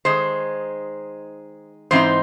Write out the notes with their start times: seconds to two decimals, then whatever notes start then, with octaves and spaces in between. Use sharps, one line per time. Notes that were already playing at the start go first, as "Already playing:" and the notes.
0.05 D#3 G#3 D#4 C5
1.91 G#2 E3 C4 D#4 C5